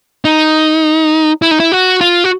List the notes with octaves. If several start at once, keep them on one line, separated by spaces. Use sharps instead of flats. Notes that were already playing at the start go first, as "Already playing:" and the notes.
D#4
E4
D#4
E4
F#4
F4
F#4